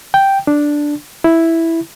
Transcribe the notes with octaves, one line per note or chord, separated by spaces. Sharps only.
G5
D4
E4